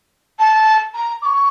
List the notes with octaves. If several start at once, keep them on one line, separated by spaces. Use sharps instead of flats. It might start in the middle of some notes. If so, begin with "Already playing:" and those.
A5
A#5
D6
C#6